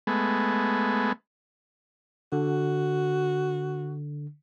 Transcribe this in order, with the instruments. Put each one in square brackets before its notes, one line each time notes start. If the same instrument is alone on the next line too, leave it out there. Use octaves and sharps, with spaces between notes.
[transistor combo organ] G#3 A3 B3
[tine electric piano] D3 [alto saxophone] F#4